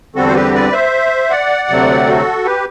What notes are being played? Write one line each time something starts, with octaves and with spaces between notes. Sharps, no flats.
E2 D3 G3 C4 F#4 A4
C5
G4 B4
B4 D5
C5 E5
D5 F#5
D2 C3 F#3 A3 C4
F#4 A4
G4 B4